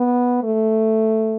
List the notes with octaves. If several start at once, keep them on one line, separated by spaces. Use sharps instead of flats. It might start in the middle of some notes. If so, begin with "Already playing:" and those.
Already playing: B3
A3